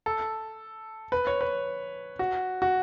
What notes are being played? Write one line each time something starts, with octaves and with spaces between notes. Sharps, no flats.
A4
B4
C#5
B4
F#4
F#4